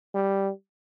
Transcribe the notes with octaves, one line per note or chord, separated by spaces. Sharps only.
G3